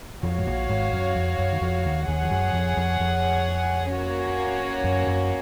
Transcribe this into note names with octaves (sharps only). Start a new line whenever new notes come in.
F2 F3 F#4 C#5 F5
G#2
A#1 A#2
G#1 G#2
F#2
F2
F#2
D#3
F2 F3
D#2 D#3
D#2 D#3 G#4 C#5 F#5
F3
F#2 F#3
F2 F3
F2 F3
F2 F3
A#3 C#4 F#4 C#5
F#2 F#3
F#2 F#3